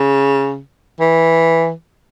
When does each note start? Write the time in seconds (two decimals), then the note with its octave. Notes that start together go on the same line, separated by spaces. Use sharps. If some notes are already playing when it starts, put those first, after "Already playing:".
Already playing: C#3
1.00 E3